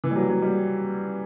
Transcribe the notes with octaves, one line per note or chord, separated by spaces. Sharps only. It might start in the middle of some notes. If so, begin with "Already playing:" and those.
E3
G3
F#3
F#3
G3